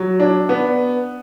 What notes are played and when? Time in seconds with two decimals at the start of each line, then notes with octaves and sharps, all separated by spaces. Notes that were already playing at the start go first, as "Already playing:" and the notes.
Already playing: F#3
0.20 D4
0.49 B3